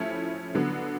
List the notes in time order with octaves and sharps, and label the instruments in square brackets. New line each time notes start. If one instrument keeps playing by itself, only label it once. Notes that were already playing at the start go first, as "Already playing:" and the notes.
Already playing: [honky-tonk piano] F3 A3 C#4 E4
D3 F#3 B3